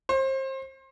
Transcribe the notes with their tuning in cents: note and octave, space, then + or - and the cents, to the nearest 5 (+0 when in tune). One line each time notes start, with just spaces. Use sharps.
C5 +30